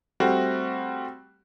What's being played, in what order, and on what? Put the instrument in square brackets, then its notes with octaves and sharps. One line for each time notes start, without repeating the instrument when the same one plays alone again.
[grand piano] G3 A3 C4 F#4